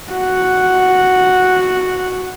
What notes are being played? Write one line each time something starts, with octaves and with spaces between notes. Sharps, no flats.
F#4 F#5